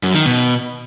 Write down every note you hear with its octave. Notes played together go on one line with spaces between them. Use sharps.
F#2
D#3
B2